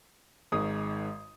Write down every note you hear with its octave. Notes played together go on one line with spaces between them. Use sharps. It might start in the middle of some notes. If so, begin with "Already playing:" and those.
G#1 G#2 D#6